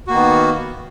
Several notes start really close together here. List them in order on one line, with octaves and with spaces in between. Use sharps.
F#4 A#3 D#3 B3